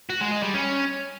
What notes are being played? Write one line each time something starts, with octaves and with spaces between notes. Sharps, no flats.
F#4
G#3
G#3
G3
C#4